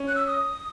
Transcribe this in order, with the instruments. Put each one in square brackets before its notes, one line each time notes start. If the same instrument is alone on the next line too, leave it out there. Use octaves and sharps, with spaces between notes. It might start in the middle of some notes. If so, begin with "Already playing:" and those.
Already playing: [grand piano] C#4
[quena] F#6
E6
D#6